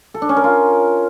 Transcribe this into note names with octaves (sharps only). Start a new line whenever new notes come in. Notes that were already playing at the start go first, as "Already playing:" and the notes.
A4
D4
C#4
A#4
F4